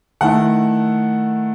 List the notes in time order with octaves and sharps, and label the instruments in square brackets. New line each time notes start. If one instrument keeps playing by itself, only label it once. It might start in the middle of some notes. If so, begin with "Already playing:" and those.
[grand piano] D#3 A3 E4 F#5